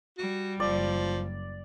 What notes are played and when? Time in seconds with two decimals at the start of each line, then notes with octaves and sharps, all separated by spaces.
0.18 G3 F#4
0.60 F#1 F3 D5